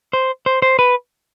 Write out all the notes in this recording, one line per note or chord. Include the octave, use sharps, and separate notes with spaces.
C5
C5
C5
B4